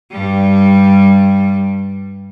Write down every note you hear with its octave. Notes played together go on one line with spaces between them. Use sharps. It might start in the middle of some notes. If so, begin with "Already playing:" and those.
G2 G3